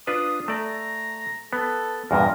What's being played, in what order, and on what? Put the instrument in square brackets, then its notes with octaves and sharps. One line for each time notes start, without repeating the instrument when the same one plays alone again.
[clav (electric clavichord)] D4 F4 B4 [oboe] D#6
[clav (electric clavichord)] A3 D5 [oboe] A#5
[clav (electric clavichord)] B3 [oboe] A4
[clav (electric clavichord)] E2 G2 A#2 [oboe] A#4